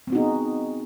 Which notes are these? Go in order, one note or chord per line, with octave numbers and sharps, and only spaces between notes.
B3 C4 D#4 F#4 G#4